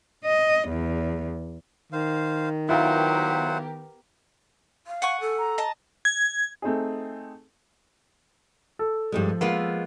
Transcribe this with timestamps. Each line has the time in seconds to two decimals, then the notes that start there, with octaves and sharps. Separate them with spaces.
0.25 D#5
0.68 E2
1.93 D#3 C5 F5
2.69 F#3 B3 E4 F4 G4 A#4 C5 F#5
4.87 F5
5.02 F#5 G#5 C#6
5.21 A4
5.38 A#5
5.58 D#5 A5
6.05 G#6
6.62 A3 C4 D#4 G#4
8.79 A4
9.12 G2 F3 G3 G#3
9.41 G#3 A#3 B3 F4